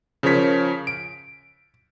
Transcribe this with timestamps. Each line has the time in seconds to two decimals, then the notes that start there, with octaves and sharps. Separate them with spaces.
0.23 C#3 F3 A#4 C#5 B6
0.87 D7